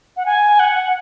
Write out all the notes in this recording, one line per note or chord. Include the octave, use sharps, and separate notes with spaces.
F#5
G#5
F#5